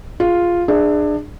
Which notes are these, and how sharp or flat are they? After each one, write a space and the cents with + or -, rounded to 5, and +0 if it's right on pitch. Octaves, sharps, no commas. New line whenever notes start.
F4 +0 G#4 +0
D4 +25 G#4 +0 E5 +0